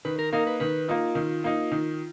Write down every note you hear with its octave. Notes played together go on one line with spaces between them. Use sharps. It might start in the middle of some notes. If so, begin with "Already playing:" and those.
D#3 B4
A#4
A#3 D#4 A#4
B4
D#3 B4
A#3 D#4 F4
D#3
A#3 D#4
D#3